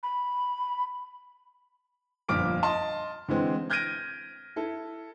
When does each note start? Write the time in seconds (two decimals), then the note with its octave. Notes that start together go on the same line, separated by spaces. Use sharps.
0.03 B5
2.29 G1 F2 A#2 D6 F6 D7
2.63 D#5 A5 C6
3.29 D3 E3 G#3 C4
3.70 F6 G6 G#6 A#6 D7 D#7
4.56 E4 A4